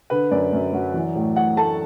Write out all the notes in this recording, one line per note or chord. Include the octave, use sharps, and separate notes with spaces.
D3 B4
F#2 D5
F#2
F#3
E3
A2
A2 F#5
A3 A5